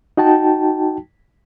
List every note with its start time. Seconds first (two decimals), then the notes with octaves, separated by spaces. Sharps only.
0.17 D#4 F#4 G5 A5